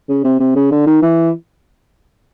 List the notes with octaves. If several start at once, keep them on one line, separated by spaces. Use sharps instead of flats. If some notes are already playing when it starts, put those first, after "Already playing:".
C#3
C3
C3
C#3
D3
D#3
E3